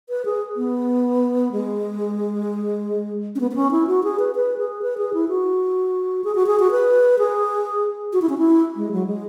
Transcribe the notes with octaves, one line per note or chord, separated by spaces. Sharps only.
B4
G#4
B3
G#3
C#4
B3
B3
C#4
E4
F#4
G#4
B4
B4
G#4
B4
G#4
E4
F#4
G#4
F#4
G#4
F#4
B4
G#4
F#4
E4
C#4
E4
G#3
F#3
G#3